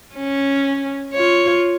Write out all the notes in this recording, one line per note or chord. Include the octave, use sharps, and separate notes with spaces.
C#4
F4 C#5